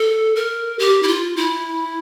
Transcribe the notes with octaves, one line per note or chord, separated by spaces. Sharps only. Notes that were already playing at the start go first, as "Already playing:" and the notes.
Already playing: A4
A#4
G4
E4
F4
E4